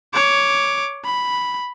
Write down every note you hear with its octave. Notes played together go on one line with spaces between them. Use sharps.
C#5 D6
B5